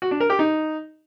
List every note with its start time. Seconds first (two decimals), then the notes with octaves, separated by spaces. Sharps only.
0.02 F#4
0.11 D4
0.20 A#4
0.30 G4
0.39 D#4